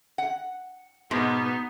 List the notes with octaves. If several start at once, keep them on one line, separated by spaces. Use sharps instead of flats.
F#5
G#2 B2 G#3 B3 D#4